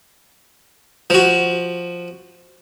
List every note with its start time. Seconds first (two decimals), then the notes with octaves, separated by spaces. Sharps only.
1.10 F3 F#4